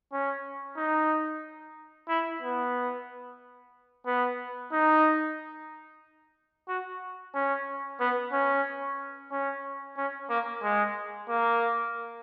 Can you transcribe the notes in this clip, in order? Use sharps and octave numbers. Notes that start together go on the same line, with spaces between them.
C#4
D#4
E4
B3
B3
D#4
F#4
C#4
B3
C#4
C#4
C#4
A#3
G#3
A#3